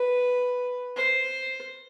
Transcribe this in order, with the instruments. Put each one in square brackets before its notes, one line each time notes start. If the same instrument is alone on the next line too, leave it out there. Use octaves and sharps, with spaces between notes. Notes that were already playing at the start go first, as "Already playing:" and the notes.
Already playing: [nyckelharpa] B4
C5